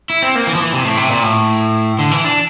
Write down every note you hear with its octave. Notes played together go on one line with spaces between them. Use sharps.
E4
C4
A#3
E3
F3
E3
C3
A2
C3
A#2
A2
D3
E3
D4